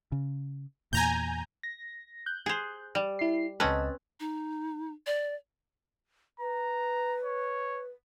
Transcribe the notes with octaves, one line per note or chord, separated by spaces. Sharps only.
C#3
E2 A#2 G#5 A#5 G6
A#6
F#6 G6
G#4 C5
G3
E4 C7
C#2 C4 C#4 B4 D#5 A5
D#4
D5
B4 A#5
C#5